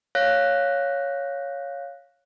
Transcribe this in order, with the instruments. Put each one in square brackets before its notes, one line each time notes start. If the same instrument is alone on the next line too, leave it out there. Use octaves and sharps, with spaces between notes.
[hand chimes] C#5 F5 F#6 A#6